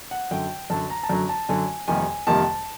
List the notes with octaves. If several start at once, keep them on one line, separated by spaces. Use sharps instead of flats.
F#5
F#2 D3 F#3 G5
F#2 D3 F#3 A5
A#5
A5
F#2 D3 F#3 A#5
A5
F#2 D3 F#3 G#5
F2 C3 D#3 G3 A#3 G#5
F2 C3 D#3 G3 A#3 A5